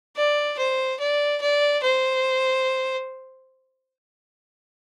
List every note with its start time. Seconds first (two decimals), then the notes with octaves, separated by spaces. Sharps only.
0.16 D5
0.58 C5
1.00 D5
1.41 D5
1.83 C5